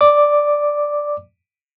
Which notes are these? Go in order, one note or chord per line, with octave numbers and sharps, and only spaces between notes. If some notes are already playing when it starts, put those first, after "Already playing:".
D5 D6